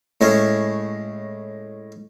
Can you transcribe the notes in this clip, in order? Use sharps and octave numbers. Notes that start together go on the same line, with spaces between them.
A2 G#3 C#4